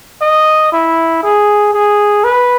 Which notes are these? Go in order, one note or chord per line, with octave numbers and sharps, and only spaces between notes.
D#5
E4
G#4
G#4
B4